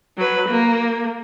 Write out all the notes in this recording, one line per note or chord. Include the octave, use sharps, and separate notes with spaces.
F#3 B4
A#3